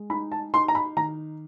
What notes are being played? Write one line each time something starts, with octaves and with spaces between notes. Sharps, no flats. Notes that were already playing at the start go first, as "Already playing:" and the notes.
Already playing: G#3
D#4 B5
A5
D#4 C6
A#5
B5
D#3 A#5